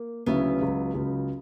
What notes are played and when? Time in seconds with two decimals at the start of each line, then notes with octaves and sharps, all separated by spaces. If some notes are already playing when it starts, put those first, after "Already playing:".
Already playing: A#3
0.26 D2 C#3 F#3 B3 C#4 E4
0.61 C#2 C#3 F#3
0.94 C#2 C#3 F#3